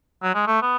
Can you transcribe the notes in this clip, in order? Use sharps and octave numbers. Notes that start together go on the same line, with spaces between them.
F#3
G#3
A3
B3